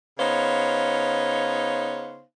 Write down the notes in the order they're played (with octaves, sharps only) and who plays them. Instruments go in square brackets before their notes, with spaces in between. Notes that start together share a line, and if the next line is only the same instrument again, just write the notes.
[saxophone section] C#3 B3 D#4 C5 C#5 F5